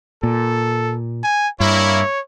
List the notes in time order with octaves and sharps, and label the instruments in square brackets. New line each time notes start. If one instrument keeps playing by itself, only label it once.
[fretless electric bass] A#2 [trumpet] A4
[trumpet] G#5
[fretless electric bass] G2 [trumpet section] A#3 E4 [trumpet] C#5